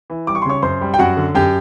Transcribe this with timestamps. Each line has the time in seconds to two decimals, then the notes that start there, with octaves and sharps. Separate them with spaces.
0.10 E3
0.27 G3 D6
0.35 C#6
0.42 C6
0.46 C#3 C#5 C#6
0.62 F#2 C5 C6
0.81 G3
0.94 G5
0.99 F#2 F#4 F#5
1.17 D3
1.35 F#2 G4 G5